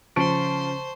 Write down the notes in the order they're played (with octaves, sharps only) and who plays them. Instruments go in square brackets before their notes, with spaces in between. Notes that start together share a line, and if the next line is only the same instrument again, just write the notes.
[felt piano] C#3 D7 [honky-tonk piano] F3 [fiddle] C5 C6 [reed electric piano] A5 C#6